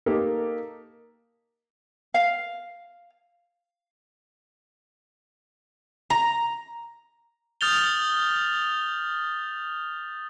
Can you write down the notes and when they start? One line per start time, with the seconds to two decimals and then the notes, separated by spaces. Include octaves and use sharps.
0.06 A#3 D#4 G4 A4
2.14 F5
6.10 A#5
7.61 D#6 F6 G6 A6 F7 G7